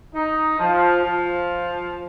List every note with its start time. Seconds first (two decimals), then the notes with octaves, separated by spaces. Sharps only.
0.14 D#4
0.58 F3
1.03 F3